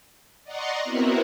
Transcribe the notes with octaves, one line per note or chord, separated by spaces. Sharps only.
D5 D#5 F#5 A#5 C6 C#6
B3 C4 E4 F#4 A#4